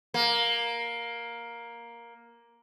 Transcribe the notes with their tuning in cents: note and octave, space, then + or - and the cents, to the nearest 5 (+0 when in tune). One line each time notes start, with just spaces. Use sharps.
A#3 +10